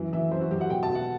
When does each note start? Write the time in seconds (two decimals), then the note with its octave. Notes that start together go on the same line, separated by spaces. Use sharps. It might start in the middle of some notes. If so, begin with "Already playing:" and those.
Already playing: F#2 E3
0.13 E3 E5
0.31 F#2 C5
0.41 F#4
0.51 F#2 G4
0.61 F#5
0.70 B2 G5
0.83 A5
0.89 B2
0.95 F#5